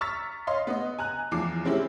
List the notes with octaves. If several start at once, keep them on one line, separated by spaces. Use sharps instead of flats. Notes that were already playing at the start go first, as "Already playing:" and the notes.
A#5 C#6 E6 F6 A6 B6
C#5 D#5 F5 C6
B3 D#5
G#5 A#5 F#6
E2 E3 F3 D6 C7
G#3 C4 C#4 E4 G4